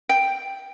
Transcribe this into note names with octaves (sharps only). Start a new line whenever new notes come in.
G5